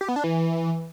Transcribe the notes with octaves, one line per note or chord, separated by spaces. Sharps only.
G4
B3
D4
E3